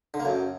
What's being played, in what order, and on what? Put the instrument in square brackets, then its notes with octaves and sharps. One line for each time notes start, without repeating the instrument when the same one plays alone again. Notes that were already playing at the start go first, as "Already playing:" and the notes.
[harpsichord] D3
A#3
F#2